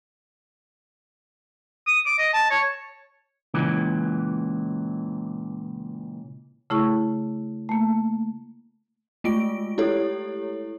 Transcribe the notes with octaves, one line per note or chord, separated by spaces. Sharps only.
D#6
D6
D#5
A5
C#5
C#2 A#2 C#3 E3
C#3 A3 E4 G#4 C#6
A3 A#3
G#3 A3 F4 D7
E4 G4 A4 C#5